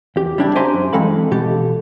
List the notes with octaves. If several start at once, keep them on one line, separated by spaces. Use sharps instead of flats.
E2 G4
G3 C4 D4 E4 G4
C5 D5 E5 G#5 A#5 C6
F#2
E3 G#3 C4 A4 F5 B5
B2 E3 G4 A4